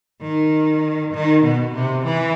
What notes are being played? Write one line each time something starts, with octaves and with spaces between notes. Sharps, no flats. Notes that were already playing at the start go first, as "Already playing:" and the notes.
D#3
D#3
B2
C3
E3